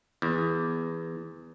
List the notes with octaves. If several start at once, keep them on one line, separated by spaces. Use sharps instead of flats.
E2